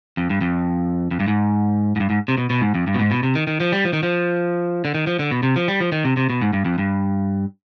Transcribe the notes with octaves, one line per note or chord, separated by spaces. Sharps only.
F2
G2
F2
F2
G2
G#2
G#2
G2
G#2
C3
B2
B2
G#2
F2
G2
B2
G#2
B2
C3
D#3
D#3
F3
G3
F3
D#3
F3
D3
D#3
F3
D3
B2
C3
F3
G3
F3
D#3
C3
C3
B2
G#2
G2
F2
G2